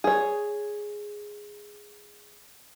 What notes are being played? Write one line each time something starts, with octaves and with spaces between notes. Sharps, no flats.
G#4 C#5